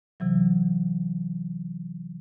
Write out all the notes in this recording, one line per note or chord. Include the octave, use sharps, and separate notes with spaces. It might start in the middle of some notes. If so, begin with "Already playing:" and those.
C3 E3 F#3